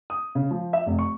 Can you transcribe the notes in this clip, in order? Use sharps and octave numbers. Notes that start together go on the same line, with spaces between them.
D#6
C#3
F3
E5
F1
C#6